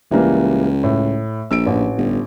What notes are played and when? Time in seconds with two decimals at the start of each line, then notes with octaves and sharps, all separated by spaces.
0.11 C#2 E3 G3 A#3
0.84 A2
1.51 A#1 E6 D7
1.67 A1
1.98 G1